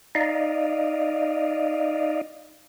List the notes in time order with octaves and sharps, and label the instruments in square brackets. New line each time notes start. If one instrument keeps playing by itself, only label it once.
[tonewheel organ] D#4 D5 D#5 F5